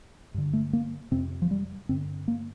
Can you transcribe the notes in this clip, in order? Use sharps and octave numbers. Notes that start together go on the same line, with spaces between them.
G2 D3
A3
A#3
F2 C3 C4
F3
G3
G2 D3 C4
A#3